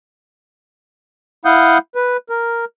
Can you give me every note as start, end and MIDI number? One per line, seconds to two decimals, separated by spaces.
1.45 1.78 64
1.45 1.78 77
1.45 1.78 78
1.45 1.78 87
1.45 1.78 91
1.95 2.17 71
2.29 2.65 70